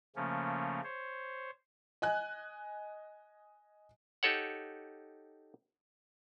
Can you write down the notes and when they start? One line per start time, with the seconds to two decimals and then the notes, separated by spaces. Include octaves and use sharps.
0.16 C#3 F3 A3 A#3 C#4
0.84 C5 C#5
2.02 D#5 G#5 F#6
4.23 D#4 G4 A4 C#5 F#5